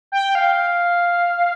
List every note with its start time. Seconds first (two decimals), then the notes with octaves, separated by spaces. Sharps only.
0.12 G5
0.35 F5